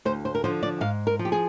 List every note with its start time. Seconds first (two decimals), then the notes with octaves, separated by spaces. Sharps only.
0.05 D2 C5
0.25 C5
0.35 A#4
0.44 D3 F3 C5
0.63 D5
0.81 G#2 F5
1.07 A#4
1.19 F3
1.25 G4
1.32 G#4